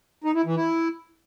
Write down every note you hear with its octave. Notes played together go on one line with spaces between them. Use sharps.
D#4
E4
E3
E4